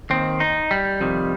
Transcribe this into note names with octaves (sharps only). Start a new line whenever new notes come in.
D#2 D#3 C4
D#4
G3
F2 C3 D#3